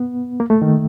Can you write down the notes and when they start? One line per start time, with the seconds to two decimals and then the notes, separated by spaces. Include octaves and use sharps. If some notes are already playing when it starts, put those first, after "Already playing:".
Already playing: B3
0.40 A#3
0.50 A3
0.62 D#3